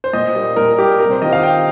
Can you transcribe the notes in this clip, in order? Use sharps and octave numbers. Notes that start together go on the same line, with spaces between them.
C5
A#2 D#5
G3 A#3
A#2 A#4
G3 A#3 G4
C3 A#4
C5
D#3 A#3 F4 D#5
F5
C3 G5